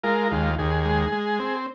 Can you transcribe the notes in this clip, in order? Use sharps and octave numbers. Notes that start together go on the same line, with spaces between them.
G#3 F4 A#4
D#2 F4
D#2 G#4
G#3
G#3
C4